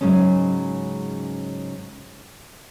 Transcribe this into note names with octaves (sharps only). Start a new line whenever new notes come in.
G#2 C#3 F#3 G#3 C#4